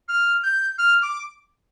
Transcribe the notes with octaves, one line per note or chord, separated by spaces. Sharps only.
F6
G6
F6
D6